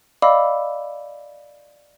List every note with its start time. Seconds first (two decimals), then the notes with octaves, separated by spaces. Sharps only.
0.22 D5 D#5 F5 B5 D6 E6